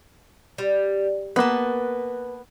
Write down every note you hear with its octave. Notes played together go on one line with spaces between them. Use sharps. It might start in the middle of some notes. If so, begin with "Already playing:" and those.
G3
A#3 B3 B4 A5